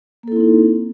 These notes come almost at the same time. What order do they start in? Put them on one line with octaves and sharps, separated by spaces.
A#3 A4 E4 C4 D#4